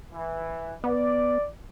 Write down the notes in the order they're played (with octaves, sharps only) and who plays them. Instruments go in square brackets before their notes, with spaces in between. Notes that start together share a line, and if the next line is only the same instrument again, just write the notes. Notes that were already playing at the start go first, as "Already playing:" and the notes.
[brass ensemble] E3
[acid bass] B3 [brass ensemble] D5